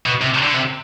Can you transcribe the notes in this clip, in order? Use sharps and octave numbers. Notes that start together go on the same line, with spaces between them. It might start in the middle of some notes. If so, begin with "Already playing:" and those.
B2
C3
D3
C3